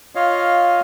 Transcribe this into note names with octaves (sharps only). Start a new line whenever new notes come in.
F4 C#5 D#5 F5